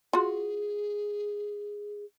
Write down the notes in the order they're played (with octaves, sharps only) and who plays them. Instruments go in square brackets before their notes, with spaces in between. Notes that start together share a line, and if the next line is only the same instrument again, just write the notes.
[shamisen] F4 F#4 [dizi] G#4